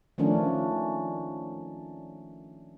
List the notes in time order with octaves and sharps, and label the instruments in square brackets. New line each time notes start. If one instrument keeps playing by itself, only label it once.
[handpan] D#3 F3 A3 C#4 D4